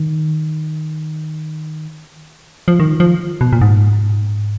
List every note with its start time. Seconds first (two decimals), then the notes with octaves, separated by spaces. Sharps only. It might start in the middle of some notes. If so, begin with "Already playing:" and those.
Already playing: D#3
2.68 F3
2.80 D#3
3.00 F3
3.41 B2
3.53 A#2
3.61 G#2